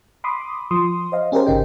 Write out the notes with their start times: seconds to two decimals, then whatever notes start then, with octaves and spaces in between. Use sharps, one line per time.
0.24 B5 C6 D6 D#6
0.71 F3 C6 D#6
1.12 C5 D#5 F5
1.32 C#4 G4 G#4 A#4 C5
1.47 G#1 C#3 D#4 G5